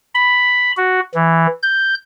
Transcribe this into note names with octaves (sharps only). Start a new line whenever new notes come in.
B5
F#4
E3
G6